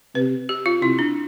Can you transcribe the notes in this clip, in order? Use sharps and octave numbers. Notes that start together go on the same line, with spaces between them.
C3 B4
G4
F4
C3 E4
D4